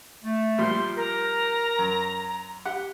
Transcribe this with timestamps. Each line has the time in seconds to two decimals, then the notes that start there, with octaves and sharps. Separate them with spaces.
0.24 A3
0.58 A#2 F3 G3 C6
0.97 A#4 A#5
1.79 F#2
2.66 G4 F#5